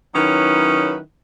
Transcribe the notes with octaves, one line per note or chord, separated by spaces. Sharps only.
D#3 F#3 C#4 D#4 E4 B4